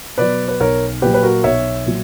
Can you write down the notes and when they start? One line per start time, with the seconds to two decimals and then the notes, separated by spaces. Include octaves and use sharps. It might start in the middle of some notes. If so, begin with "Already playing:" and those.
0.18 B2 F#3 B4 D5
0.48 B4
0.60 B1 A#4 C#5
1.02 A#2 F#3 G4 B4
1.14 B4
1.23 F#4 A#4
1.44 B1 C#5 E5
1.86 A#2 F#3